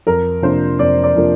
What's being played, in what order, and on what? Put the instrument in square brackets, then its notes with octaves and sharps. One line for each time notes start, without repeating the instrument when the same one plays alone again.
[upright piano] F2 A#4
C3 F3 A#3 D4 C5
F2 D5
D5
C3 F3 A#3 D4